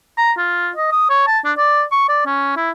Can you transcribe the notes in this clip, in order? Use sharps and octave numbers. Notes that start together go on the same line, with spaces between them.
A#5
F4
D#5
D#6
C#5
A5
D4
D5
C#6
D5
C#4
E4